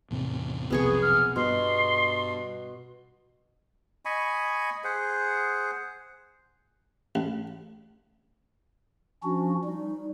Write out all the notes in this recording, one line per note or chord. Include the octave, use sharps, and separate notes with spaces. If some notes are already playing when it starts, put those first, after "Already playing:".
E2 A2 C3
B1 F2 C3 B3 G#4 C#6
F6
G2 B2 C6
D#5 G#5 B5 C#6
G#4 C5 F#5
A1
F3 C#4 D4 F#4
G3 D#4